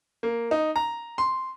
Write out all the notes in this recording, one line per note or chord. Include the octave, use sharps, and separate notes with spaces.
A#3
D#4
A#5
C6